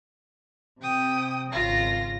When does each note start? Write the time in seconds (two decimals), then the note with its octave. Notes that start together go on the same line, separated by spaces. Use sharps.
0.82 C3 G5 D#6
1.52 G#1 C#3 F4 A#6